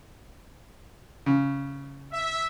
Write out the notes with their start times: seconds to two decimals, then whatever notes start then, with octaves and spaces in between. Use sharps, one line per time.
1.26 C#3
2.13 E5